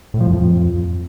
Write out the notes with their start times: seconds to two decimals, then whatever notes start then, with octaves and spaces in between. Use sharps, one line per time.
0.14 A2
0.20 F3
0.27 F2